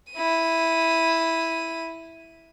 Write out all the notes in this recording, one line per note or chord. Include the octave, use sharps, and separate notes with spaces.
E4 D#7